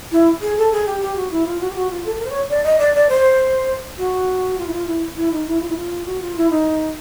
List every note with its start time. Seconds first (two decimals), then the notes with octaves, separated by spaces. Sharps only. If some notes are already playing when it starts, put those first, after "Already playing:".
0.12 E4
0.41 G#4
0.57 A4
0.72 G#4
0.86 G4
1.01 G4
1.16 F#4
1.31 E4
1.46 F4
1.60 F#4
1.70 G4
1.75 F#4
1.91 F4
2.05 A4
2.15 A4
2.20 A#4
2.25 C5
2.30 C#5
2.50 D5
2.64 D#5
2.79 D5
2.94 D5
3.09 C5
3.97 F#4
4.58 F4
4.67 E4
4.73 F4
4.87 E4
5.17 E4
5.32 D#4
5.47 E4
5.61 F4
5.69 E4
5.76 F4
6.05 F#4
6.21 F4
6.36 E4
6.50 D#4